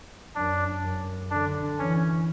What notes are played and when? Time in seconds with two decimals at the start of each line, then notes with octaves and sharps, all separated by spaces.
0.35 F#2 D4
0.83 F#2
1.31 D3 D4
1.79 E3 C#4